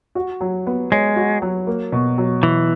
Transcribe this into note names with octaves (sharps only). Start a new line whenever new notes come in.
F#4
F#3
B3
G#3 C#5
F#4
F#3
A#3
B2
F#3
B2 E3